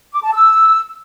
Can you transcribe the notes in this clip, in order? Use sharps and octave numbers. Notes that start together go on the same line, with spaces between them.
D6
A5
E6